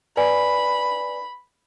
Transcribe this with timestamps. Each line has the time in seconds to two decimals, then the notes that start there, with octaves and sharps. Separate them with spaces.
0.17 B4 D5 G#5 B5